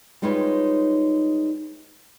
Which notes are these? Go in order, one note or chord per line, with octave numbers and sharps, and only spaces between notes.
G3 G#3 D#4 F4 B4 C#5